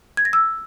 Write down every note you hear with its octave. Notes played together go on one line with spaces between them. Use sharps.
G#6
A#6
E6